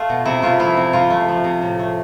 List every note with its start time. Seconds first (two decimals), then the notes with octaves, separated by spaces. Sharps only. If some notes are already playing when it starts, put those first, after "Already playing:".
Already playing: A3 F4
0.09 B2
0.26 C3 E4
0.42 A3 F4
0.59 F3 E4
0.77 C3
0.93 C3 F4
1.10 A3
1.28 F3
1.44 C3
1.62 A2
1.79 A3